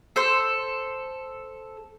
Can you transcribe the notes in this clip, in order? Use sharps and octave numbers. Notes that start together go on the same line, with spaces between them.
A4 C5 C6